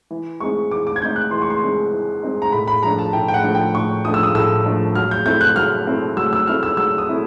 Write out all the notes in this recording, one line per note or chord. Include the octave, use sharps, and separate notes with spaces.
E3
G#3 C4 D#4 C#6
E3 D6
D6
G#6
G#3 C4 D#4 G6
F#6
E3 C6
C#6
C6
G#3 C4 D#4
E3
G#3 C4 D#4
A#5
A2 B5
B5
F3 A3 D4 A#5
A5
A2 G5
G5
F#5
F3 A3 D4
G5
A2 C#6
F3 A3 D4 D#6
E6
D#6
A2 E6
F3 A3 D4
F#3 F6
G6
A3 C4 E4 G6
F#6
F#3 F6
A3 C4 E4
F#3 E6
E6
A3 C4 E4 F6
E6
F#3 E6
D#6
A3 C4 E4